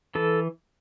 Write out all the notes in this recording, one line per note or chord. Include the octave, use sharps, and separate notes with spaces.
E3 A4